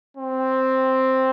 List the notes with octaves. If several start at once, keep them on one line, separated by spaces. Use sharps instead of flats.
C4